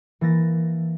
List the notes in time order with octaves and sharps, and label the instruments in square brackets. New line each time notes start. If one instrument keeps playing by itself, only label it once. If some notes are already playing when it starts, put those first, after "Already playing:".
[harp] E3 A#3 A6 A#6